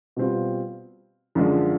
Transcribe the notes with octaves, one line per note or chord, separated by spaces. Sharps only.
B2 G3 C4 F4
F#2 D3 F3 G#3